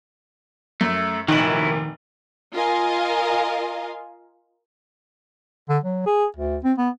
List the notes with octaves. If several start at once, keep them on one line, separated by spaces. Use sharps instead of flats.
F#2 A3
F1 A#2 D#3 F#3 E4 F#7
F4 A#4 D#5 F5 G#5
D3
F#3
G#4
D2
C4
B3